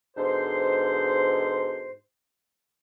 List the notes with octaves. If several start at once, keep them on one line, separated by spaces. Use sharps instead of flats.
G#2 B2 D3 C5